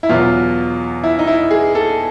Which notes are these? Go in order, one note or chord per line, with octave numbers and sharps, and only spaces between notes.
E4
E2 B2 F#3 F4
E4
D#4
E4
G#4
A4